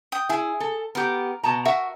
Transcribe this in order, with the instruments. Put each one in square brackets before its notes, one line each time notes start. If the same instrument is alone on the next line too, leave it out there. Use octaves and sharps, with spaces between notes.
[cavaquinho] G5 D#6
[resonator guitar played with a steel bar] E4 [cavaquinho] G#4 G#5
[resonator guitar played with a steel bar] A4
[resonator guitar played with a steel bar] B3 G4 [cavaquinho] A#4
[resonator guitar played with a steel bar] B2 A5 A#5
[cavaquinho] F#4 [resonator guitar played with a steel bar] A#4 E5